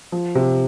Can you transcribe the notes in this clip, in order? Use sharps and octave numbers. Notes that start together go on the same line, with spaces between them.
F3
C3